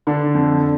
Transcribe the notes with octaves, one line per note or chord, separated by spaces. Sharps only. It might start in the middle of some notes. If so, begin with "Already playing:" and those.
D3 D4
F2